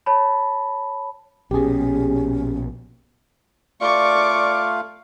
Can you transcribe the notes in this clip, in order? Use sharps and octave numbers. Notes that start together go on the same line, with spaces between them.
C#5 A5 B5
A#1 B2 C#4 G4 G#4
A3 F4 D5 F5 C#6 D6